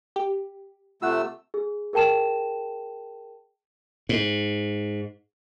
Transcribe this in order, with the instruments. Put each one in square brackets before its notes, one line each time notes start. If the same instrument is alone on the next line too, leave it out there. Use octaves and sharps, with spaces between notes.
[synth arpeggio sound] G4
[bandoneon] C3 A3 E6 [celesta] F4 F#5 F#6
[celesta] G#4
G#4 A#4 G5 A5 E7
[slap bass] G#2